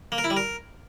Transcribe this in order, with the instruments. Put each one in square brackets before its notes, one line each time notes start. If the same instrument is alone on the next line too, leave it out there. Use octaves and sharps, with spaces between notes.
[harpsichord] A#3
A#4
E4
G3
A#4